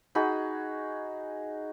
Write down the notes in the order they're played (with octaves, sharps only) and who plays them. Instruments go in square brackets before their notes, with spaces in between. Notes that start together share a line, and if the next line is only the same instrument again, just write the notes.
[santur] D#4 F#4 G#4 B5